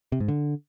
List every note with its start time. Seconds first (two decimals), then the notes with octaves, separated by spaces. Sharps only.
0.12 C3
0.20 G#2
0.28 D3